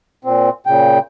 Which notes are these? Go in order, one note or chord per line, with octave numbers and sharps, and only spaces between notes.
A#2 C4
A#2 C#3 G5